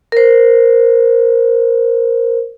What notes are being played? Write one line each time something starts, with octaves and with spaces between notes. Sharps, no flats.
A#4 C5